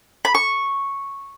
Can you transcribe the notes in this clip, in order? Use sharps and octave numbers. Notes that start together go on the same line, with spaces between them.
B5
C#6